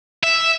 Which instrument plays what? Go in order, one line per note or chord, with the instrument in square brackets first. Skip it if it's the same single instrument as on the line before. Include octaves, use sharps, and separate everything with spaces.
[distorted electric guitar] E5